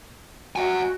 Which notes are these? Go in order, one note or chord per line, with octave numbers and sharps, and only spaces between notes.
F#4 F#5 G#5